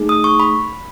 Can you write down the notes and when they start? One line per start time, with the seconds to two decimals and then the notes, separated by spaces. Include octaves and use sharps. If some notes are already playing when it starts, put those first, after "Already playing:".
Already playing: A3 D#4 G#4
0.09 D#6
0.24 C#6
0.40 B5